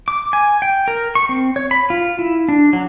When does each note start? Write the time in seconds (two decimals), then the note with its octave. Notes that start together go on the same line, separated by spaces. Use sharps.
0.08 D6
0.33 G#5
0.62 G5
0.88 A#4
1.15 C#6
1.29 C4
1.56 C#5
1.71 B5
1.90 F4
2.19 E4
2.49 D4
2.73 F#3